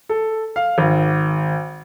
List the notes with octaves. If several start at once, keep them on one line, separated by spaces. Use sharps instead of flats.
A4
F5
G#1